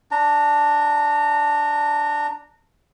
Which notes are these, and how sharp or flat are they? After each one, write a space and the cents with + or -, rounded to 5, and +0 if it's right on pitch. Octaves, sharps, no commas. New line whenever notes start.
D4 +0 A#5 -25